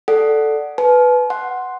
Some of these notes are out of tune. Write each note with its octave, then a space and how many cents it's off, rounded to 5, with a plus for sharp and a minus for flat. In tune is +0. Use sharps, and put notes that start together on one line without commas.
A4 +0 D5 +0 F#5 +5
B4 +5 A5 -45
F#5 +0 C6 +0